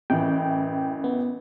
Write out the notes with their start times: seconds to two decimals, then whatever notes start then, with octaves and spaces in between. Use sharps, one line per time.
0.10 A1 F#2 E3 G5
1.04 B3